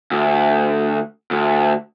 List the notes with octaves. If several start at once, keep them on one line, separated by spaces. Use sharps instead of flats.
D2
D2